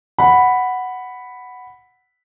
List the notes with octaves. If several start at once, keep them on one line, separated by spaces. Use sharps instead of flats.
F#5 B5